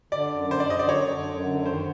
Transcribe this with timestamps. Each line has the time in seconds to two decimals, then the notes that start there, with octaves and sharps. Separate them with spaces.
0.12 D3 D5
0.31 F#2
0.50 D3 C5
0.60 D5
0.70 F#2 D#5
0.79 D5
0.89 D3 C#5
1.08 D3
1.28 F#2
1.47 D3
1.65 D#3 C5